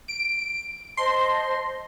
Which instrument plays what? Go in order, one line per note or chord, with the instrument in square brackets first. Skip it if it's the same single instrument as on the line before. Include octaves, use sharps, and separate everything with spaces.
[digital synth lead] D7
[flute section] C5 D#5 A5 [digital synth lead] C6